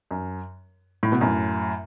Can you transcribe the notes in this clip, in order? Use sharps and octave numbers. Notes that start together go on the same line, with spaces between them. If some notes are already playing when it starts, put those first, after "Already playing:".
F#2
A2
B2
F#2 A2